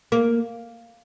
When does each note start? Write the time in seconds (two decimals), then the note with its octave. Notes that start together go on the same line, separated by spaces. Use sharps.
0.12 A#3